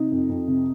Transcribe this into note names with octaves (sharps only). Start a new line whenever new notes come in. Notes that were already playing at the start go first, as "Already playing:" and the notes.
Already playing: C3 D#4
F2
F2
C3